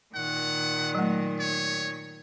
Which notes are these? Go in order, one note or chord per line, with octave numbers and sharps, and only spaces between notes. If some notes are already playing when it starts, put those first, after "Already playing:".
A#2 D#3 F#5
F#3 A3
C#5